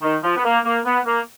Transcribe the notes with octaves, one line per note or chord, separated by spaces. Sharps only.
D#3
F3
B3
A#3
A#3
B3
A#3